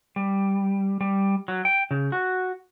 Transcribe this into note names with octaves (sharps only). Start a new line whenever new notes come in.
G3
G3
F#3
G5
C#3
F#4